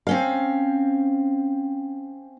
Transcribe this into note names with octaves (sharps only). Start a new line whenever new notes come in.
C4 C#4 F5